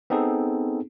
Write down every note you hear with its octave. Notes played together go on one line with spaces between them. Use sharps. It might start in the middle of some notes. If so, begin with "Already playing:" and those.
B3 C4 D#4 G#4 A4